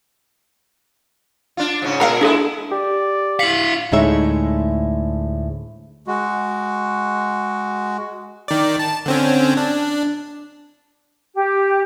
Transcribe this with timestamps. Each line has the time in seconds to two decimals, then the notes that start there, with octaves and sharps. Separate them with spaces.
1.57 D4 F4
1.82 G#2 C#3 C#4
2.00 A#2 G#4 A#4 F5 F#5 A#5
2.21 G#3 D4 E4 G#4 A4
2.72 G4 D5
3.39 E4 F5 B6 C#7 F#7
3.92 D2 A2 G#3 D#4 C#5 E5
6.07 G#3 F#4
8.48 D#3 D5
8.79 A5
9.06 D3 C4 C#4
9.57 D4
11.35 G4